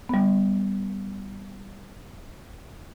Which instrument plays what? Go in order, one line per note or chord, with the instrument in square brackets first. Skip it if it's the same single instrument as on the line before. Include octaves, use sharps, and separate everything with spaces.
[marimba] G3 B3